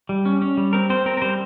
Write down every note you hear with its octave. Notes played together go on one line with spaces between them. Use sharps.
G3
C#4
C#4
G3
C4 A#4
C4 C5
C4 A#4
A#4
G3 C5